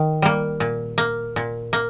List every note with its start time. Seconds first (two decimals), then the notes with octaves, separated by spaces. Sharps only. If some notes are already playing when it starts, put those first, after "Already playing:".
Already playing: D#3
0.22 G3 A#3
0.60 A#2
0.98 A#3
1.36 A#2
1.73 A#3